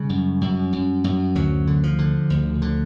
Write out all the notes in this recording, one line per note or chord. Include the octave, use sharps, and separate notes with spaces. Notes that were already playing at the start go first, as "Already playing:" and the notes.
Already playing: C#3 G3
F#2
F#2
F#2
F#2
D2 F#3
D3
F3
D3
D2
D3